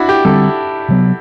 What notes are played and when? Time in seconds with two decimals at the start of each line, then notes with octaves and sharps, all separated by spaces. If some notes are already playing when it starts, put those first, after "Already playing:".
Already playing: D4 E4 F#4
0.09 G4
0.25 D3 G3 C4 A4
0.88 C3 F#3 B3